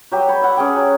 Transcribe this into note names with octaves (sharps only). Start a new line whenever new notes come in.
F#3 G4
C#5 B5
E5 F#5
C#4 G#4 G5
F#3